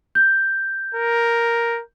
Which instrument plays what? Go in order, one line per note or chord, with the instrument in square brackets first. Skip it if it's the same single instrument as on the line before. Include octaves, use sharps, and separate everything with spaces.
[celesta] G6
[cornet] A#4